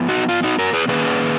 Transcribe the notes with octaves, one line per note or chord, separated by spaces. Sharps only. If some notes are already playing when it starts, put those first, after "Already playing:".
Already playing: F3 B3
D#4 F#4
F4
D#4 F#4
F#4 A#4
G#4 B4
D#3 A#3 C#4 G#4 B4